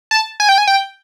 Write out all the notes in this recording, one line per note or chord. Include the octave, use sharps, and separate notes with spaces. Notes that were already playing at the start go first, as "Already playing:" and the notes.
A5
G#5
G5
G#5
G5